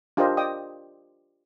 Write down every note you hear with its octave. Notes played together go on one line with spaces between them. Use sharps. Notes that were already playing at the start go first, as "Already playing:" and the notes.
D4 F4 G4 A#4 C5 D#5
D5 D#5 G5 D#6